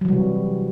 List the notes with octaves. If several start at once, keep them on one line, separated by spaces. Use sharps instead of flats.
C3 E3 F#3 G3